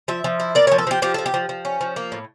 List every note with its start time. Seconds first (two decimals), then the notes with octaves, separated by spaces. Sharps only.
0.08 F3 E5
0.24 F3
0.40 E4
0.55 A#3 D5
0.67 F3 C#5
0.78 A4
0.87 F3 G4
1.02 F3 G4
1.14 F3 A4
1.26 G4
1.34 F3
1.49 F3
1.65 C#4
1.81 F3
1.96 A#3
2.12 A2